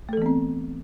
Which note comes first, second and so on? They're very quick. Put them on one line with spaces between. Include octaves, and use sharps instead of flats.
A3 A4 E3 B3 C4